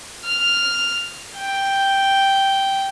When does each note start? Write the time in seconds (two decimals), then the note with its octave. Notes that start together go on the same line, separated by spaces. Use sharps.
0.24 F6
1.37 G5